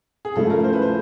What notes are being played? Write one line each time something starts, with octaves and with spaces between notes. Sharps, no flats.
G#4
C#3 F3 A3 C#4 E4 A4
A#4
C5
B4
C5